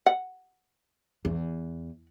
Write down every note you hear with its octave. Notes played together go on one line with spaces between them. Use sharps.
F#5
E2